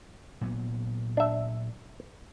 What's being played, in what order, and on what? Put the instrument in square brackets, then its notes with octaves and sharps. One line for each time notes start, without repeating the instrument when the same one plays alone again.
[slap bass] A#2 F#3 B3
[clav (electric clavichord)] D4 E5